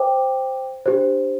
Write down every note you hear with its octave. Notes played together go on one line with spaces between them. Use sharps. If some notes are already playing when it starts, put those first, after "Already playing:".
Already playing: C5 G5 D6
D4 G4 C5